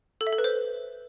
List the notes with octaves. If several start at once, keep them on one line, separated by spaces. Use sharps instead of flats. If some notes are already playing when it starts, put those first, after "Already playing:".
A4
E5
A4
B4
C5